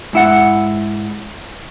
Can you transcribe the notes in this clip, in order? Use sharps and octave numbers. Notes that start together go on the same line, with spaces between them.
G#2 E4 F#5